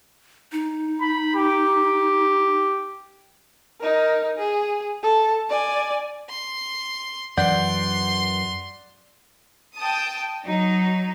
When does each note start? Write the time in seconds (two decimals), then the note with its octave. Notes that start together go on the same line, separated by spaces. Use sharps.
0.52 D#4
1.01 B5
1.35 G4
3.80 D#4 A#4
4.38 G#4
5.03 A4
5.49 D5 G#5
6.29 C6
7.37 F#2 E3 D5 F#5 C6 G6
9.77 G5 A5 D#6
10.45 F#3 D#4